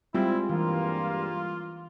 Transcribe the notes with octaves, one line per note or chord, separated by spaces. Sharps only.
G3 G#3 C4 E4 F4
G2 E3 A#3 F4